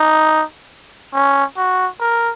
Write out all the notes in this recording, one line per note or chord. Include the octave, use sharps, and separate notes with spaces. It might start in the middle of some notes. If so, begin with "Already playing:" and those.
Already playing: D#4
C#4
F#4
A#4